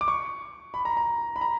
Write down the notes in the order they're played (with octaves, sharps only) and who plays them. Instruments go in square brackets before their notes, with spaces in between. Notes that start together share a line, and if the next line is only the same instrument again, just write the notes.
[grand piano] D6
C#6
B5
A#5
A#5
B5
A#5